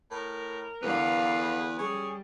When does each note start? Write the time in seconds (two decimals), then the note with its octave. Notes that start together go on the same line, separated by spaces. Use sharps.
0.11 A2 A#4
0.83 E2 D3 B4 F5
1.79 G3 C#4 G#4